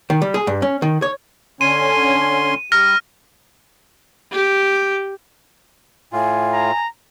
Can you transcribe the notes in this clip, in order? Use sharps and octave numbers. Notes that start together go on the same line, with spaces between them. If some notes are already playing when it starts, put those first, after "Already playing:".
D#3
G3
G#4
G2
C#4
D#3
C#5
D3 C#4 G#5 C6 D#7
G3 F6 A#6
G4
A2 F4 G#5
A#5